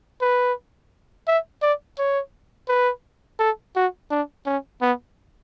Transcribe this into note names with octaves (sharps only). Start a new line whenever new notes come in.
B4
E5
D5
C#5
B4
A4
F#4
D4
C#4
B3